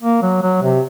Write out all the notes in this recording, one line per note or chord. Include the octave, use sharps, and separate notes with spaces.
A#3
F#3
F#3
C3